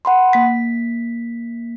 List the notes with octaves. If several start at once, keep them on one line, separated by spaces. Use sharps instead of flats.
F#5 B5 C6
A#3 B6